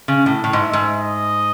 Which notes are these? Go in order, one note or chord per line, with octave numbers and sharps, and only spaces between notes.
C#3
A2
A2
G#2
E5
G#2
D#5